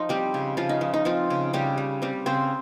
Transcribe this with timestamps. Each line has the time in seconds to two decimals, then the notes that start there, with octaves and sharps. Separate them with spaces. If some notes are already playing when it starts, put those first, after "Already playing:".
Already playing: F3 D#4 F4
0.09 G3 C4 G4
0.34 C#3
0.57 C#3 F3 F4
0.69 D#4
0.81 F3
0.94 D#4
1.05 F3 C4 F4
1.30 C#3
1.53 C#3 G3 G4
1.78 G3
2.02 G3 C4 G4
2.26 C#3 C4 C5